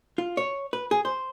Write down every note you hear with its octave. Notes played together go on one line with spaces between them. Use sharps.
F4
C#5
B4
G#4
C5